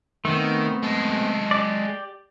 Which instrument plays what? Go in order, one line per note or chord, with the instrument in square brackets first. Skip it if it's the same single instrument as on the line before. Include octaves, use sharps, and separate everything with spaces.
[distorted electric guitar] D#3 [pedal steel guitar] A3 B3 C4
[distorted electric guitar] G#3 A4
[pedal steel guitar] G4 D5